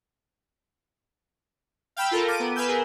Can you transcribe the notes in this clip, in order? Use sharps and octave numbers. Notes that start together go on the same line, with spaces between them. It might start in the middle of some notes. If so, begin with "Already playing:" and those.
F5 G5 B5 E6
F4 A4 A#4
D6 D#7
B3
B4 F5 G#5 E6 G6
G#4 A#4